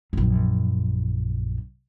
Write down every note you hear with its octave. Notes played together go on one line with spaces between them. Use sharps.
A#1 F#2